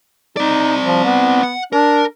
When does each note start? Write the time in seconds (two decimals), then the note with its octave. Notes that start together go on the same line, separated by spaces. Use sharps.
0.37 C4 D#4 D5
0.84 F3
1.04 B3
1.43 F#5
1.73 D4 A#4